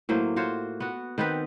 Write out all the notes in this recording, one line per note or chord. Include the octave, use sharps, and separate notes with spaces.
A2 F#3 A#3 C5
F4 F#4 C5 C#5
B3 F#4
D#3 B3 C4 B4